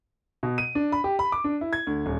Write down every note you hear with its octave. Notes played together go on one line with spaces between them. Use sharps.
B2
D#7
D4
B5
G4
B5
D6
D4
E4
G#6
D2
D#1